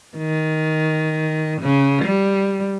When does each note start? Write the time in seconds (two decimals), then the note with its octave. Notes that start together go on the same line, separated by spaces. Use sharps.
0.17 D#3
1.61 C#3
2.04 G3